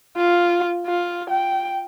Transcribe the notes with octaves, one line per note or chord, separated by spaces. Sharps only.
F4
F4
G5